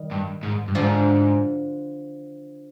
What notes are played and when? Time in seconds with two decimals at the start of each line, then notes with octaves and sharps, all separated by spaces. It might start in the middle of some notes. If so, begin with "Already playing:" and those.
Already playing: D#3 G3
0.12 G2
0.43 G#2
0.68 G2
0.75 G#2 D3 F3